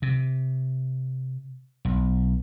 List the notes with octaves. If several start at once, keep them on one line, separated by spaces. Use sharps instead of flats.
C3
B1